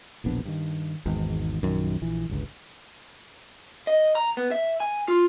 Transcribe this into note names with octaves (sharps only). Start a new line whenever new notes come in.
E1 A#1 B3 D4
G2 D#3
G#1 E2 G#2
A#1 F#2 D#3
A#1 E3
G1 C#2 G2
D#5
A#5
B3
E5
G#5
F4